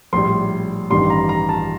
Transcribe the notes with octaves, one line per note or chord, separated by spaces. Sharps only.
A#1 A2 G3 C6
A1 G2 D#3 G3 C6
A#5
A#5
A5